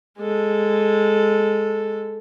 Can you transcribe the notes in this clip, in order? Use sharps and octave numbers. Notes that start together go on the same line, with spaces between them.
G#3 A4